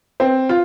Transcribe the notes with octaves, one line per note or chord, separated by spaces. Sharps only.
C4
F4